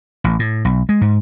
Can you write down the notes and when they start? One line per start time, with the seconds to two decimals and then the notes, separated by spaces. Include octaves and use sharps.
0.24 A1
0.39 A2
0.65 B1
0.89 G#3
1.01 G#2